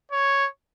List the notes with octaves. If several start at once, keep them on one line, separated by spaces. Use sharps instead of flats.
C#5